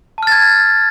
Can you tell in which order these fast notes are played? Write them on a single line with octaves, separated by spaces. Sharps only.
A5 F6 A6 G#6